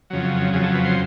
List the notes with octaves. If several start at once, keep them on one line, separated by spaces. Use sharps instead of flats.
F2 C#3 F#3
F2 C#3 F#3 G#4
A4
B4
C5